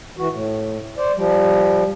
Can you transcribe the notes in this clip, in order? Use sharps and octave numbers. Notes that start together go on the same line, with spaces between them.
E3 F#4
A2
C5 D5
F3 G3